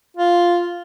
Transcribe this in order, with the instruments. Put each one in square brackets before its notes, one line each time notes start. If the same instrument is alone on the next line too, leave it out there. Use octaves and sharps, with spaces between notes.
[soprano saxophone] F4